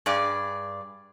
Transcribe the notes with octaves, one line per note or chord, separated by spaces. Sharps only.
G2 G#4 D5